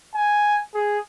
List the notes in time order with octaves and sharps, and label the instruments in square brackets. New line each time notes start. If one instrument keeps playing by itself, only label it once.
[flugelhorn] G#5
G#4